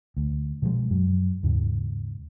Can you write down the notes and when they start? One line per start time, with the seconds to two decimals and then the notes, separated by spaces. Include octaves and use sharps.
0.17 D2
0.62 B2 F3 F#3 G#3
0.90 F#2 F#3
1.43 D#2 G#2 C#3